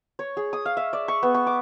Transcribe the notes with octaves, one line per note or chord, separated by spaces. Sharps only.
C#5
G#4
D#6
F5
E5
D5
C#6
B3
C#6
D6